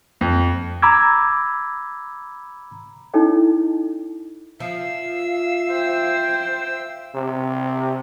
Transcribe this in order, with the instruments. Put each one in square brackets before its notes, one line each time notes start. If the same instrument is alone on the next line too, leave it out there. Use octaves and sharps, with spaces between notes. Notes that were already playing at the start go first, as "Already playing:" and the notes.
[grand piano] F2
[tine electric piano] A#5 B5 D6 E6 G#6
[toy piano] C#4 D#4 E4 A4 C#5 D#5
[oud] F3 [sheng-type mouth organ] E5 E6 [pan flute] F5
[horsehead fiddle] C5 G5
[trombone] C3